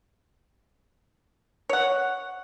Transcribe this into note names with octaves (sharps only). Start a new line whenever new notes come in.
C#5 F#5